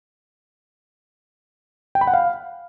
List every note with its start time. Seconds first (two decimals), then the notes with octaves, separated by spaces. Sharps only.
1.95 G5
2.01 B5
2.07 F#5
2.14 F5